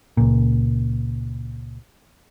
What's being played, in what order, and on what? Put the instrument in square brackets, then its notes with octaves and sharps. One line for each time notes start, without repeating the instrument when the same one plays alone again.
[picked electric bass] C#2 A#2